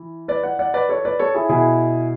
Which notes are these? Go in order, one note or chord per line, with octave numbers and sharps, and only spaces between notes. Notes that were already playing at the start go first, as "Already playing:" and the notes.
Already playing: E3
B4 D5
D5 F#5
D5 F#5
B4 D5
A4 C#5
B4 D5
A4 C#5
E4 G#4
B2 E4 G#4